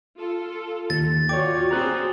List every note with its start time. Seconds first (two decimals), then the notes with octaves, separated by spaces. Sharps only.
0.17 F4 A4
0.90 D#2 A6
1.29 F4 F#4 C#5 D5 G5 D6
1.71 C4 F#4 G#4 A#5 F#6